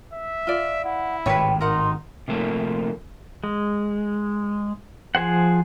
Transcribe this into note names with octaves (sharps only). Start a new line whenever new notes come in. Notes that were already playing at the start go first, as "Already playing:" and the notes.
E5
F4 D5
E4 F#5
G#1 A2 C3 B4 C#5 G5
D#4 A#4 F#5 C6
C3 F3 A3 A#3
G#3
F3 G#4 C5 F#5